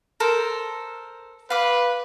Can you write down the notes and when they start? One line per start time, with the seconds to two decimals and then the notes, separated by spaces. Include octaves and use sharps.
0.20 A4 A#4 C5
1.50 B4 F5 D6